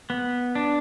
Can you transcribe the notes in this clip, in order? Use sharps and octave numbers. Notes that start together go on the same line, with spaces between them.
B3
D4